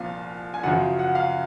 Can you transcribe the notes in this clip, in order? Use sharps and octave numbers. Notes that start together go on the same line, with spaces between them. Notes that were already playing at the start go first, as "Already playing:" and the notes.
Already playing: C2 A#2 F3 F5
G#5
F#2 C#3 F3 F#5
F#5
F5